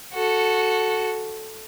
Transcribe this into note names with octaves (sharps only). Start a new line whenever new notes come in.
F#4 A4